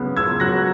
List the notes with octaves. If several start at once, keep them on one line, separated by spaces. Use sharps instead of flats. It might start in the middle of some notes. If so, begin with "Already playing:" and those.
Already playing: C#2 C#3 F#3 B3
C#2 E6 G#6
F#3 F#6 A#6